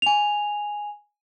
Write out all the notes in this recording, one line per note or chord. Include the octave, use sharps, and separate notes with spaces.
G#5 F7